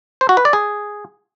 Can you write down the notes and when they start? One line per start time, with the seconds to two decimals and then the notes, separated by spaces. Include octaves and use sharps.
0.21 C5
0.29 F#4
0.37 B4
0.45 D5
0.53 G#4